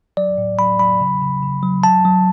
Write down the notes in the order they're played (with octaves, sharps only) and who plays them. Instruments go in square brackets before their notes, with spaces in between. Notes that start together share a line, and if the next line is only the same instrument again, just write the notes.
[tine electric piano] F#3 D5
A2
F#3 B5
F#3 B5
C#3
C#3
C#3
F#3
F#3 A5
F#3